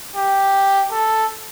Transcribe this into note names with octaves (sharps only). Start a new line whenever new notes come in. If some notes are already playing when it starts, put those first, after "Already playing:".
G4
A4